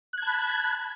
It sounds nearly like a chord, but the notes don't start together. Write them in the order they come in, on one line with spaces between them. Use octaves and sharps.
F#6 G#6 A5 B5